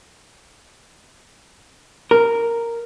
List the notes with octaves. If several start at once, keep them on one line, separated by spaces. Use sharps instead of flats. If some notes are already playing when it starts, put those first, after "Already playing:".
A#4